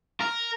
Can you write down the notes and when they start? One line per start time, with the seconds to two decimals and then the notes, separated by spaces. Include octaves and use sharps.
0.21 A#4